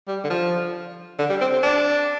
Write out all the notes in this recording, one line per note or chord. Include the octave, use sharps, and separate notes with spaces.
G3
D3
F3
D3
G3
C4
C4
D4